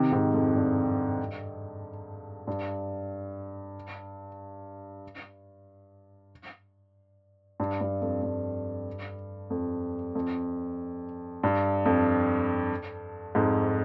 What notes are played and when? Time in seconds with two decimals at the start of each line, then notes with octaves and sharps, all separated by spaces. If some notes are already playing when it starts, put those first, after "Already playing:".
Already playing: C3 D#3
0.12 G#2 C3
0.34 F2
0.56 G2
2.47 G2
7.60 G2
7.81 G2
8.01 F2
8.23 G2
9.50 F2
10.15 F2
11.43 G2
11.86 F2
13.35 F2 G#2